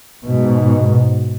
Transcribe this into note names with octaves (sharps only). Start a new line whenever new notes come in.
G#2 B2